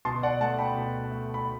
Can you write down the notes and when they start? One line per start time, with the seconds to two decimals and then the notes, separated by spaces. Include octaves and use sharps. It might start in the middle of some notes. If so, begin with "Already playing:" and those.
0.05 B2 A5 C6
0.23 D5 F#5
0.40 A3 F#5 A5
0.59 G5 B5
0.76 B2
1.11 A3
1.34 B5